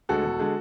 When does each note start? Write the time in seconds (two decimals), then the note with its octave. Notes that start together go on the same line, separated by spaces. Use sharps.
0.09 D2 D3 G#3 F#4 A4
0.24 E1
0.39 D3 G#3